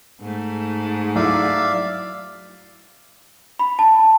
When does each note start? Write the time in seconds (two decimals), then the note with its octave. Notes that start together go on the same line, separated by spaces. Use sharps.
0.21 G#2 A3
1.16 F#3 E4 D5 E5 F5
3.59 B5
3.79 A5